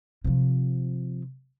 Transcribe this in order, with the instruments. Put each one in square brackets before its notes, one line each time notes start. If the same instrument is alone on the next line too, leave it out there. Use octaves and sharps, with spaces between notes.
[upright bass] C3 F3